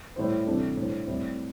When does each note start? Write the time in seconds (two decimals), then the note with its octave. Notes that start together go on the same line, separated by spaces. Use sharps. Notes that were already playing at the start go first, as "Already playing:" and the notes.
0.16 A2 G3 E4 C5
0.46 C3 E3 G3 D4 A4
0.77 A2 G3 D4 C5
1.07 A2 G3 C4 E4